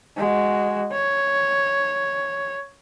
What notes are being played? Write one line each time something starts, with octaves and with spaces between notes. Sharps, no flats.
G#3 F#4
C#5